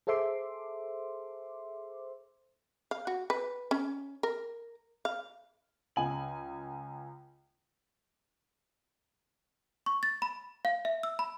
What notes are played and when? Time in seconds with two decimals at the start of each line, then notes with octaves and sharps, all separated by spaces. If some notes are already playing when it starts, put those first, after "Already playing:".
0.07 G#4 A4 C5 E5 C6 D6
2.91 F5
3.07 F#4
3.30 B4
3.71 C#4
4.23 A#4
5.05 F5
5.96 C#2 G#5 F#7
9.86 C#6
10.03 A6
10.22 B5
10.65 F5
10.85 E5
11.03 E6
11.19 B5